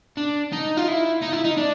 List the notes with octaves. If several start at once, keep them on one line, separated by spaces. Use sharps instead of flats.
D4
D#4
F4
E4
D#4
E4
D#4
D4